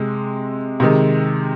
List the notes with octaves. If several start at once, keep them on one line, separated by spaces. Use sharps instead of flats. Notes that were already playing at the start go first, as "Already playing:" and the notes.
Already playing: C3 G#3
C3 D#3 G#3